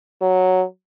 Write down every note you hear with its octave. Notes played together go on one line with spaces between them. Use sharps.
F#3